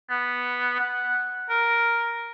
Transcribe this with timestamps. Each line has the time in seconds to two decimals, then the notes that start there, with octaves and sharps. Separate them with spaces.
0.10 B3
0.80 F#5
1.50 A#4